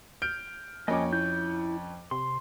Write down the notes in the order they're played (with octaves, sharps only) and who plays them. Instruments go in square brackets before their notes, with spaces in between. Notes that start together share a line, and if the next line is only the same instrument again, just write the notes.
[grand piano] F6 G6 D7
[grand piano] F2 C#4 D6 [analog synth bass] A#3 [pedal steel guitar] D#5 G#5
[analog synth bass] E4 [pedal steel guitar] G6
[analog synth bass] C3 [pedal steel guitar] C6